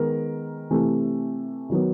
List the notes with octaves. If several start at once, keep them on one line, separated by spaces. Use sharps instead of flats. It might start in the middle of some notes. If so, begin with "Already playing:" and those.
Already playing: D#3 G#3 B3 A#4
C3 E3 A3
D#3 F#3 B3